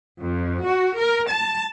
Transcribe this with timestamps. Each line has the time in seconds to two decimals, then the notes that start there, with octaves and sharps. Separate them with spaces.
0.20 F2
0.64 F#4
0.96 A#4
1.30 A5